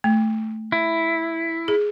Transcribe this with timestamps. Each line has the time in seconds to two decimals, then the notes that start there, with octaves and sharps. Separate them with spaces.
0.04 A3
0.72 E4
1.68 G#4